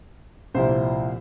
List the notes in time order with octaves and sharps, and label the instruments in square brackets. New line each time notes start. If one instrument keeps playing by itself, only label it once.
[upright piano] C2 A#2 F3 A#3 E4 C5